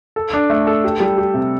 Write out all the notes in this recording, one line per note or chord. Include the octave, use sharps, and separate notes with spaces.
A4
D4
A3
A4
G4
G3
G4
C3